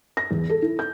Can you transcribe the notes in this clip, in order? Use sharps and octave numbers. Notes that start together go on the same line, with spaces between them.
A#6
E2
A4
E4
G6